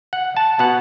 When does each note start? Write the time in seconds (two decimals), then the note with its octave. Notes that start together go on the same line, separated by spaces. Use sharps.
0.13 F#5
0.37 A5
0.59 B2 B3 F#5